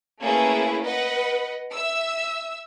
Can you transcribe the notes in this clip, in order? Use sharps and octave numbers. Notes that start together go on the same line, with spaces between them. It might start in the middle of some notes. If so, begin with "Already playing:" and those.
A3 A#3 C#4 E4 G#4 B4
B4 D#5 F#5
E5 E6